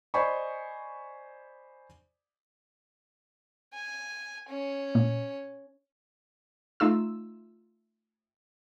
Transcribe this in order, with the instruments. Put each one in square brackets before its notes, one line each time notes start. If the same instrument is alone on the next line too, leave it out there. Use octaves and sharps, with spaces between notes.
[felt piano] C5 D5 D#5 G#5 B5 C#6
[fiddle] G#5
C#4
[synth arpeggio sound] A#2
A3 D#4 F4 E6